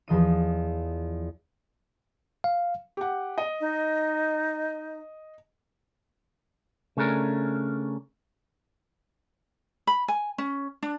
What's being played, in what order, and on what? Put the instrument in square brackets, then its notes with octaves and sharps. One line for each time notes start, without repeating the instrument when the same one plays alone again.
[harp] E2 F3 D#5 D#7
[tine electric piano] F5
[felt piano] G4 F#5
D#5
[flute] D#4
[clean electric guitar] C#3 A3 C#4 D4 A#4
[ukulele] B5
G#5
C#4
D4